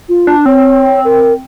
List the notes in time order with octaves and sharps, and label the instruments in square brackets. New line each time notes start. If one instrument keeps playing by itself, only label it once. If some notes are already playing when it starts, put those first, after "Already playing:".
[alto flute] F4
[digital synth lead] D4
[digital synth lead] C4 [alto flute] C#5
[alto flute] A#4